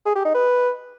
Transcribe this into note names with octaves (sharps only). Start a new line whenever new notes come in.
G#4
G4
D#4
B4